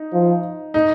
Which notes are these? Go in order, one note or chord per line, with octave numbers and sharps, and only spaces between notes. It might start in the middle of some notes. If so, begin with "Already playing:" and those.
Already playing: D#4
F3
D#4